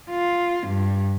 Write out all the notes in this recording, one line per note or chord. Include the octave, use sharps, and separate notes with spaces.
F4
G2